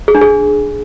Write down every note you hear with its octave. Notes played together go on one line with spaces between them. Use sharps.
G#4
D4
G#4